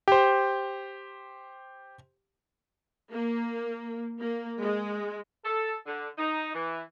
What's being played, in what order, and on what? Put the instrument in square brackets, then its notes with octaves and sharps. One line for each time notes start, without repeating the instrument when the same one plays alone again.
[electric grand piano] G4 C5
[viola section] A#3
A#3
G#3
[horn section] A4
D3
D#4
E3